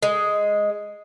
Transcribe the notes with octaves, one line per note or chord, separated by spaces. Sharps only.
G#3